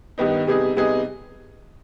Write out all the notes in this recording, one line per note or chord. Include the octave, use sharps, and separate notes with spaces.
G2 D#3 B3 D#4
C3 G3 B3 D#4 G#4
C3 G3 B3 D#4 G#4